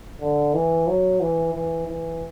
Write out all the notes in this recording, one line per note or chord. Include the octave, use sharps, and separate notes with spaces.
D3
E3
F#3
E3
E3
E3